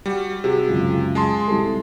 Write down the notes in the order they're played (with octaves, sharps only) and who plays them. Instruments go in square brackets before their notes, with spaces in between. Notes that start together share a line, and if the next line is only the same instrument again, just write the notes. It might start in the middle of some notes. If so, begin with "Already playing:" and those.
[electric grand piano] G3 F#4
[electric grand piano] C3 [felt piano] F#4 G#4
[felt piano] C#2 F#2 C#3
[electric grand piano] G#3 A5 C6
[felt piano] C2 G3 A4